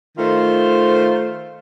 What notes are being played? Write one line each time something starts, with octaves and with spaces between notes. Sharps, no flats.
D#3 A3 F4 C5